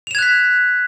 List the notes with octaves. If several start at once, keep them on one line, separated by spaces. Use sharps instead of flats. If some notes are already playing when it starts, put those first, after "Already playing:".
F#6 G#6 B6 E7 F7